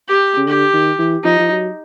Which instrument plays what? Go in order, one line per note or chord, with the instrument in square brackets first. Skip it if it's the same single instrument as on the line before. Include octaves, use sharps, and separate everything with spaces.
[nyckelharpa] G4
[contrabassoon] C#3
[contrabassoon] D3 [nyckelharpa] G4
[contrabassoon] D#3
E3
[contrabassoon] F3 [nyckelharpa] D#4
[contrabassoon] F3
F#3